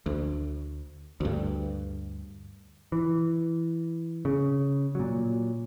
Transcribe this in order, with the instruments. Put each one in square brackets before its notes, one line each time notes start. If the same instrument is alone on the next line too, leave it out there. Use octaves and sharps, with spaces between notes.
[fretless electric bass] D2
D2 G2
[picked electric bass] E3
C#3
A#2 F#3